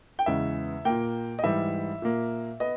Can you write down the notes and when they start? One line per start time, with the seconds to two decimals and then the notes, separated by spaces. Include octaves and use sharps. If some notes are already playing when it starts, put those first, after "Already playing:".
0.19 G5
0.26 E2 C#3 E3 G#3 E5
0.85 A#2 A#3 G5
1.39 D#5
1.43 G#2 E3 G3 E5
2.02 A#2 A#3
2.60 B3 D#5